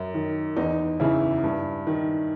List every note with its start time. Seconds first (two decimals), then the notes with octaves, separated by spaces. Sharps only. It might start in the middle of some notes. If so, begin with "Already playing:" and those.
Already playing: F#2
0.14 D#3
0.56 E2 D#4
1.00 C#3 E3 E4
1.44 G2
1.87 D#3